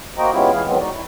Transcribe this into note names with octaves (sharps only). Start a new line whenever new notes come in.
A#3 F#4 C5 D#5 G5 A#5
G#3 B3 C#4 E4 F4 G4
E3 G#4 F5
D#3 E3 F#3 G#3 B3 C4
D#4 F#4 D5
E4